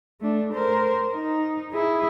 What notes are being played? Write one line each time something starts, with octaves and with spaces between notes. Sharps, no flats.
A3 D4
A#4 C5
D#4
E4 G#4